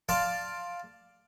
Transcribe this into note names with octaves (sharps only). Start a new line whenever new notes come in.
D5 F5 A5 C6